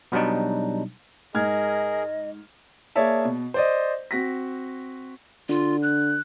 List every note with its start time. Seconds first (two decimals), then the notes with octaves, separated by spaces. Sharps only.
0.12 B2 F#3 G3 D4 D#4
1.35 G#2 G#4 A#4 D#5 F6 G#6
2.96 A#3 G#4 C#5 D5 E5 A5
3.25 B2
3.54 C5 D5 D#5
4.11 C4 F#4 A#6 B6
5.49 D3 F4
5.82 F#6